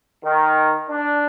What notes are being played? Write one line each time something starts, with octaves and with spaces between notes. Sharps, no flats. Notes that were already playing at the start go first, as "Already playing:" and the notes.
D#3
D4